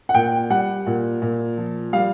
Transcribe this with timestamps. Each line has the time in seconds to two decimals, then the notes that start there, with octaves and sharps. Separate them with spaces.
0.09 F#5
0.14 A#2 G5
0.50 G3 F#5
0.86 A#2
1.22 A#2
1.58 F3
1.93 G3 F5